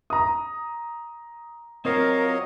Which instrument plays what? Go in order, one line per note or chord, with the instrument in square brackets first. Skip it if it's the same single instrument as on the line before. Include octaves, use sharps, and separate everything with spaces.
[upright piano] A#5 D#6
[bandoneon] F#3 C#5 D#5 [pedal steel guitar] C4 F4 F5 [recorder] A#4